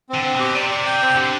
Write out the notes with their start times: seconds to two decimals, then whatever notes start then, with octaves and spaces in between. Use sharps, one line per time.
0.09 D3 C4
0.24 C4
0.34 B2
0.40 G4
0.54 C3 D5
0.70 D5
0.86 G5
1.01 C4
1.16 D3 G4